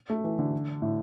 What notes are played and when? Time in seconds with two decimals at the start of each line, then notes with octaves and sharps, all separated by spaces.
0.10 A3
0.24 E3
0.39 D3
0.82 A2